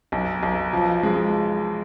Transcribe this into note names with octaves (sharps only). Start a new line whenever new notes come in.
B1
B1
F3
G#3